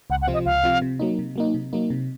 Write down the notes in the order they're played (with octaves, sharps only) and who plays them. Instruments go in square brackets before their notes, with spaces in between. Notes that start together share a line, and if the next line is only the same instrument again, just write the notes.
[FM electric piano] C#2 [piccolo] F#5
[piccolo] F#5
[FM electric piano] C3 F3 C4 F4
[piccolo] D#5
[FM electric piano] C#2 [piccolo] F5
[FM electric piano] C3 F3 C4 F4
C3
F#3 A#3 D#4
C3
F#3 A#3 D#4
C3
F#3 A#3 D#4
C3